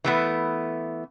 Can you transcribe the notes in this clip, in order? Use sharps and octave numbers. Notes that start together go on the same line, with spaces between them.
E3 A3 B3